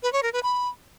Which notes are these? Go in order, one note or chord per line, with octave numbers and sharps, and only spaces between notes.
B4
C#5
A#4
B4
B5